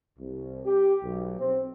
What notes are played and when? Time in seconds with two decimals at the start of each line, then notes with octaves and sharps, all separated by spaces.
0.19 C2
0.66 G4
1.04 B1
1.40 C4